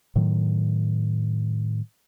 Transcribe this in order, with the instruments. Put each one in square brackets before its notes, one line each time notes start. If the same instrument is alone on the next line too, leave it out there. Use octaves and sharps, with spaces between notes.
[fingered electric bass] A2 D#3 F#3